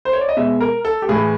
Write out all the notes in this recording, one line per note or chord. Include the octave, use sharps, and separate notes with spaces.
C5
C#5
D5
D#5
B2 G#3 E5
A#4
A4
G4
A2 E3 A3 G#4